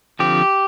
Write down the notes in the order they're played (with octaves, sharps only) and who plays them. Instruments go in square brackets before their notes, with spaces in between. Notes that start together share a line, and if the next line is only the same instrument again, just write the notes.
[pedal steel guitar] D3 F3 C4 G4